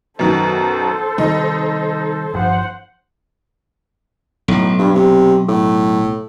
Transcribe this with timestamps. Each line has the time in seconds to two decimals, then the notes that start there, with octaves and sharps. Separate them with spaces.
0.19 F#2 B2 D#3 A4 C5
1.18 C3 D#3 G3 D#4
2.33 G1 G2 F3 C5 F#5
4.48 B1 A2
4.79 G2
4.95 C3
5.48 A2